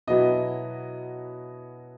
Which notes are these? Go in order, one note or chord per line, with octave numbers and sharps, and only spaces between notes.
B2 F#3 B3 E4 D#5